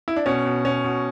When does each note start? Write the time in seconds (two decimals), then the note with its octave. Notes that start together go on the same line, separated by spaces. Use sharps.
0.08 E4
0.16 D4
0.26 B2 C#4
0.46 B2
0.65 B2 C#4
0.84 B2